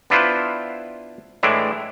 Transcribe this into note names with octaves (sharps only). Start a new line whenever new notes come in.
B3 D4 E4 F4 B4 C5
A2 E3 G#3 D4 E4